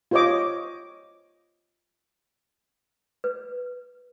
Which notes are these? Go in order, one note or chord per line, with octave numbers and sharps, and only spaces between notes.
F4 G4 C5 C#5 D#5 D6
B4